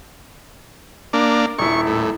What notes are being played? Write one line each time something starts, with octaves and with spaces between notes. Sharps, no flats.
A#3 D4
D#1 E4 C#6
A2